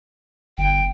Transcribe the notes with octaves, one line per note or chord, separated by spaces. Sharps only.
G1 G5